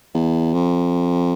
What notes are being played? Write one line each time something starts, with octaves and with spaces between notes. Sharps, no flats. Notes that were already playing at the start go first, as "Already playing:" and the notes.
E2
F2